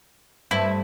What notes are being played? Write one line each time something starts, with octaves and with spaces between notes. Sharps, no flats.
G2 A3 C4 E4